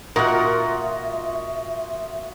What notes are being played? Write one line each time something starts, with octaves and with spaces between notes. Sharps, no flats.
A#2 F4 F#4 A#4 D#5 E5 F#5